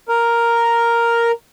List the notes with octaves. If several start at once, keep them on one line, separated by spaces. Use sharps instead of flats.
A#4